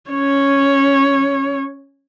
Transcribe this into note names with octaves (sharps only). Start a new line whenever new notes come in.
C#4 C#5